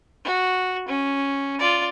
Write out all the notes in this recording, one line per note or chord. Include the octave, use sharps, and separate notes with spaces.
F#4
C#4
F4 D5